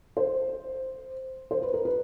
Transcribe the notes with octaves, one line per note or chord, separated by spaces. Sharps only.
C5
C5
B4
A#4
B4